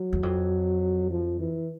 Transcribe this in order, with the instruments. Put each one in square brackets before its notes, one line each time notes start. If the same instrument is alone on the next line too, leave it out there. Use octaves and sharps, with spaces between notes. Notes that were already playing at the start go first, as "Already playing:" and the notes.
Already playing: [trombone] F#3
[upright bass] E2
F2
[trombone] F3
E3